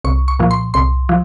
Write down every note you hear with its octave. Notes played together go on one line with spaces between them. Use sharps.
C2 C#6
C#6
A#2 F3
C6
C2 C6
F3